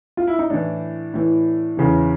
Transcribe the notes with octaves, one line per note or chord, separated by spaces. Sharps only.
F4
E4
D#4
A2 E3 D4
A2 E3
E2 C#3 E3